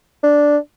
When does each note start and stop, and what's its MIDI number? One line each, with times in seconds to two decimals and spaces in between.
0.23 0.57 62